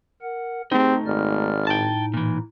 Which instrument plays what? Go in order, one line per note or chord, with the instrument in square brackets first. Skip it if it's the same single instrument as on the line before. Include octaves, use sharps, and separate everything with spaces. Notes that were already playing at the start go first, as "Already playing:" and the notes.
[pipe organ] A#4 F#5
[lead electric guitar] A3 D#4 [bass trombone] C4 [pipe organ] G4 G#4
[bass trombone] G#1 [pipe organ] D5 F6
[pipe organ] A2 D#4 [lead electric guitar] G5 A5
[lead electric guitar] A#2 E3